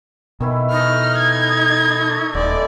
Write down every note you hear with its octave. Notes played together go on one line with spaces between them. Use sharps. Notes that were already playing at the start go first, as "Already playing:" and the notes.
B2 D#3 E3 E4
D#4 A4 C#6 F6
G#6
A4 C#6
D#1 D3 E3 G#3 D5